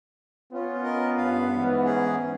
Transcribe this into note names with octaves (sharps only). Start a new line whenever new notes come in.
B3 C#4 F4
A#4 D#5
G2 F5
G#2 E3
C#4 G#4